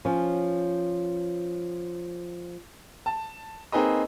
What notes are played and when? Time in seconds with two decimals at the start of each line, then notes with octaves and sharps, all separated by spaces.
0.05 F3 C#4
3.06 A5
3.72 A#3 C4 D#4 G#4 B4 D#5